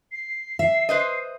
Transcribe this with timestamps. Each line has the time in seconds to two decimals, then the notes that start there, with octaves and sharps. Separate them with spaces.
0.12 C7
0.59 E5
0.89 B4 C5 D#5